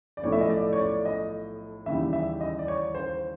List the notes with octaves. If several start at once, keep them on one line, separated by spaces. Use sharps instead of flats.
D5
B1 A2 F3 A3 C#5
E5
D#5
D5
C#5
D5
D#5
D#2 C#3 E3 G3 E5
E5
D#5
D5
C#5
C5